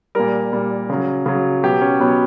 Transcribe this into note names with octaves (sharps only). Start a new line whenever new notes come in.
A#2 G3 A#4
A#2 G3
C#3 F#3
C#3 F#3
B2 F#3 G4
C#4
B2 F#3 B3